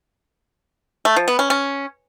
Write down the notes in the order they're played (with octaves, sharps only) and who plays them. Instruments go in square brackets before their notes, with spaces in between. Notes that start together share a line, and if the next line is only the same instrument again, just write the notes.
[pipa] A3
F3
B3
C#4
C#4